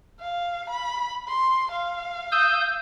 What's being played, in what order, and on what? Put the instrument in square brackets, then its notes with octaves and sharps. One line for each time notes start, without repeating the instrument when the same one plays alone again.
[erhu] F5
B5
C6
F5
[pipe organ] D#6 E6 G6